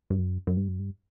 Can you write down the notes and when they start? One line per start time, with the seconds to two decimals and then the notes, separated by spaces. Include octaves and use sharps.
0.10 G2
0.18 F#2
0.47 F#2
0.57 G2
0.68 F#2
0.79 G2